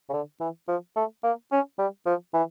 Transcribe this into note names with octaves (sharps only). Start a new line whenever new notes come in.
C#3
D3
E3
F3
A3
A#3
C#4
G3
F3
E3